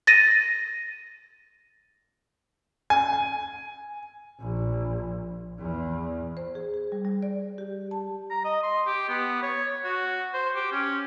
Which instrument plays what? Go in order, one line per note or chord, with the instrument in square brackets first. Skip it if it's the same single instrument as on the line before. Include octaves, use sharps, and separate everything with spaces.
[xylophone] A6 A#6 D#7
[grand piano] G#5
[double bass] A#1
E2
[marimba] C5
G#4
G#4
G3
G3
D5
G4
A5
[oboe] A#5
D#5
C6
G4
B3
C#5
F#4
C5
G4
C#4